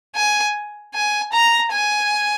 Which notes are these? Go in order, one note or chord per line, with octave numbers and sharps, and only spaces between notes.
G#5
G#5
A#5
G#5